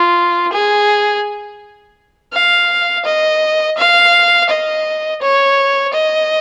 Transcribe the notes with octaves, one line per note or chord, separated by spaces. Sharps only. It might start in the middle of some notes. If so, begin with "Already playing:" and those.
Already playing: F4
G#4
F5
D#5
F5
D#5
C#5
D#5